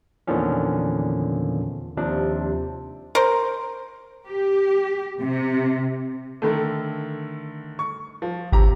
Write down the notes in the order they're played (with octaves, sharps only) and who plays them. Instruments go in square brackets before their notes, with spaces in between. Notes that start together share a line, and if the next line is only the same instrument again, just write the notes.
[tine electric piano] E2 A#2 D3 D#3 F3 C#4
D#2 C3 F3 D4
[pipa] A#4 C5
[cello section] G4
C3
[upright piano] D3 D#3 A3
C#6
F3
[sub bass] G#1 [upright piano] C3 G4 A#5